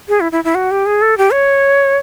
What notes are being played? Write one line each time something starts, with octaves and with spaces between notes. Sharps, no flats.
G#4
E4
E4
E4
F#4
G4
G#4
A4
G4
C#5